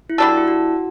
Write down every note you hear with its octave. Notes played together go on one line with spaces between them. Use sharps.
E4
G3 D4 F#4 A4
F#4
E4
F#4